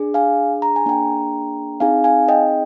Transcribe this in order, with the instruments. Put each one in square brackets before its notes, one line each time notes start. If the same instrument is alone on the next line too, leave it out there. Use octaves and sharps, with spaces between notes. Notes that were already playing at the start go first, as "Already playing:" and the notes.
Already playing: [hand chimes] D4 G#4
F5 G#5
A#5
G#5
A#3 D4 G#4 G5 A#5
C4 D#4 G#4 F5 G#5
F5 G#5
D#5 G5